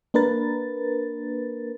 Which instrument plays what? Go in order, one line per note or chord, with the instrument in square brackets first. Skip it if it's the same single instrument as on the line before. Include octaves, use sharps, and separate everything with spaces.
[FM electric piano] A#3 D4 A#4 B4 A6